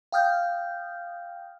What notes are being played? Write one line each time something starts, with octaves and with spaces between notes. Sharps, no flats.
F5 G5 D#6 F6 G6